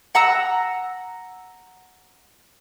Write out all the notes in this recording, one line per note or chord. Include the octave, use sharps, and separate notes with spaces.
F#5 A#5 E6